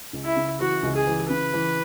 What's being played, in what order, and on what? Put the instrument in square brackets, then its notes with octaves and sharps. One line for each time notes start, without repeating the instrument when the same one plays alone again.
[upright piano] C#2
[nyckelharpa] E4
[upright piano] C#3
[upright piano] E3 [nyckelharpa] F#4
[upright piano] C#2
[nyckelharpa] G#4
[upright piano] E3
[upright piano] C#3 [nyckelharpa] B4
[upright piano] E3